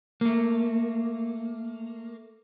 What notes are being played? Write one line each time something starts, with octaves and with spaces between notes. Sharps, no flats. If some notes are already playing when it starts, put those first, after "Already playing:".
A3 A#3